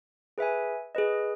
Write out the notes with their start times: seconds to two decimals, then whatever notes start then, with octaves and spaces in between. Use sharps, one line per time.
0.38 G#4 B4 E5 G#5
0.95 G#4 B4 D#5